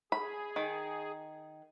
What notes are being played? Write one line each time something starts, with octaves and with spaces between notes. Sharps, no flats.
G#4 B5
D#3